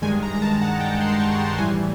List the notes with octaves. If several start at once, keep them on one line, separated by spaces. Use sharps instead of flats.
G2 D#3 G#3 G#5
A#5
A#5
A5
F#5
G5
C6
C#6
C6
A2 E3 G3 G#5